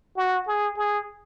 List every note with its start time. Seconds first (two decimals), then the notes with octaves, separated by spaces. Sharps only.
0.17 F#4
0.47 G#4
0.78 G#4